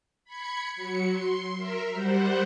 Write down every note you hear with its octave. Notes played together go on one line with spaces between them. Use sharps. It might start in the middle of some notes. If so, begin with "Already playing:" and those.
B5 G#6 C#7
F#3 C#7
C6
A#4 E5 A#5
G3 C5 F#5